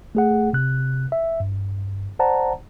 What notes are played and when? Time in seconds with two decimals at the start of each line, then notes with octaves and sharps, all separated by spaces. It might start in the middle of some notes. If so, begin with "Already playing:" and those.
0.15 A3 G#4 F#5
0.53 C3 F#6
1.12 E5
1.40 G2
2.19 C5 D5 F#5 A5 A#5